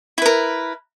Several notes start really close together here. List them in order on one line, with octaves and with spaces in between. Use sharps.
E4 B4 A#4